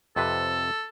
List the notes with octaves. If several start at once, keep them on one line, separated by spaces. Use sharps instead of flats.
F2 C3 A4 B4